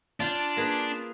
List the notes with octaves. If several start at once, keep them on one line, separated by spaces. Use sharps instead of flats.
D4 F4 G5
A#3 G#4 B4